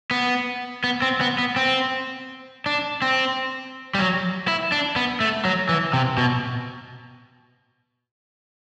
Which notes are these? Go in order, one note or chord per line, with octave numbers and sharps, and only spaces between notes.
B3
B3
C4
B3
B3
C4
D4
C4
G3
F#3
E4
D4
B3
A3
F#3
E3
C3
B2